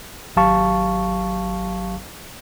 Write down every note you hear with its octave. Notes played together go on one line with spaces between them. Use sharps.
G#1 F#3 G4 F5 A5 C#6